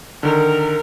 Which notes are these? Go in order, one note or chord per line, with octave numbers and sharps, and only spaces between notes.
D3 D#3 A#4